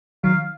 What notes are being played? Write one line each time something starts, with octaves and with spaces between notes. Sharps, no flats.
D#3 F#3 F5